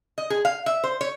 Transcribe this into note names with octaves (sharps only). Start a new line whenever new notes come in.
D#5
G#4
F5
E5
C5
C#5